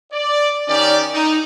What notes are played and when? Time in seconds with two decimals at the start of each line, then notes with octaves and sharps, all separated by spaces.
0.13 D5
0.68 D#3 C#4 G4 D5
1.14 D#4